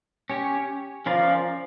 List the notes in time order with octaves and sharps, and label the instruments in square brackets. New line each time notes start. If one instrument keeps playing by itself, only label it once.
[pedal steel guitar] C#4 G4 C#5
[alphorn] F3 [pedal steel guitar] C#4 F4 A#4 D5